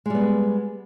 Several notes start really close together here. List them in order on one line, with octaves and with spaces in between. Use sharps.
G#3 G3 B3